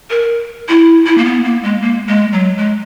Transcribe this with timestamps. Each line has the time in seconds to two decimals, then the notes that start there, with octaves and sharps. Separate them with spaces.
0.11 A#4
0.69 E4
1.06 E4
1.18 A#3
1.25 B3
1.44 A#3
1.63 G#3
1.82 A#3
2.07 G#3
2.33 F#3
2.58 G#3